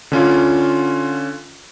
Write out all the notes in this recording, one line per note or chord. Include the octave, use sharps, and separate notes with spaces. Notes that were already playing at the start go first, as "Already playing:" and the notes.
D3 C#4 F4